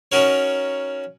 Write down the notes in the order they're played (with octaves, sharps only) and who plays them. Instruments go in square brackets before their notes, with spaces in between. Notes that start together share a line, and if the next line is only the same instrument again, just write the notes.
[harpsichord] C#4 D#4 F#4 A#4 C#5